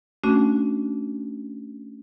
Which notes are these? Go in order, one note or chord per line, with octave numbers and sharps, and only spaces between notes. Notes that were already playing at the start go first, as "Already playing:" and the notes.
A3 C#4 D4 F#4